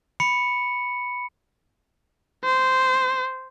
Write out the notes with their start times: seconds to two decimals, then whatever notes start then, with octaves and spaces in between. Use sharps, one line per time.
0.20 B5 C#7
2.44 C5